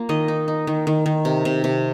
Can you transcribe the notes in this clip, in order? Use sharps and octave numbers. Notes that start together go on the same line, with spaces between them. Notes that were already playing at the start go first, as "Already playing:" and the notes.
Already playing: A#3 F4
D#3 D#5
D#4
D#4
D#3
D#3
D#3
C3
C3
C3